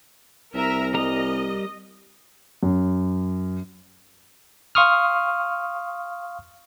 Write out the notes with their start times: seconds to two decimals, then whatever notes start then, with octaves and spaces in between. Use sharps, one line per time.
0.54 C2 A#4 E5 A#5
0.94 G3 A#4 D#5 A#5
2.63 F#2
4.75 F5 C6 C#6 D#6 F6